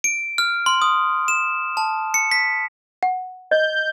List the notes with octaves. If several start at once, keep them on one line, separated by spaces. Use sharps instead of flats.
D7
F6
C6
D#6
E7
A5
C#7
B6
F#5
D#5 G6